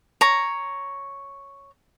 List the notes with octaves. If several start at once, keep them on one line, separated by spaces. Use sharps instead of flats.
C#5 A#5